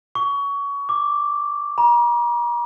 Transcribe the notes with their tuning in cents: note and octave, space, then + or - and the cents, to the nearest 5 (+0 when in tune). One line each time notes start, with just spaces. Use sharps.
C#6 +25
D6 +0
A#5 +40